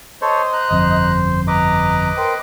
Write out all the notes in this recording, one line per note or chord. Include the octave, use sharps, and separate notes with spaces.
A4 C5 C#5 D#5
A#5 F#6
G1 F2
B4 D#5 A#5 D6
A#4 C5 G5